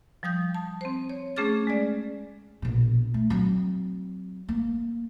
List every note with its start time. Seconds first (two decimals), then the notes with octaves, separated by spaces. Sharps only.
0.23 F3 G3 D#6 G6
0.55 A5
0.81 C4 C5
1.09 C#5
1.36 A3 C#4 G#4 D6 F6 A6
1.67 G#3 G#4 D5
2.62 A#1 B2
3.14 A3
3.30 F#3 C4
4.49 A#3